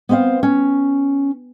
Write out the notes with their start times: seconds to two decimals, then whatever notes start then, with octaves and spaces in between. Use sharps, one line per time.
0.09 B3 C4 C5 E5 F5
0.43 C#4